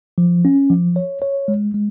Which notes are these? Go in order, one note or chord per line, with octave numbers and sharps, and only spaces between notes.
F3
C#4
F3
C#5
C#5
G#3
G#3